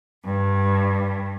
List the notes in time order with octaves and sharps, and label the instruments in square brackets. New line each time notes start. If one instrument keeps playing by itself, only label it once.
[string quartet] G2